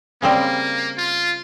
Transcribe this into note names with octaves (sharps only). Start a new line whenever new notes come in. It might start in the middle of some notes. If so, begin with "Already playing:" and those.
C#3 G3 A#3 C4
F4